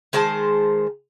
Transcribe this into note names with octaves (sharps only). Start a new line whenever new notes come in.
D#3 G#3 C5 A5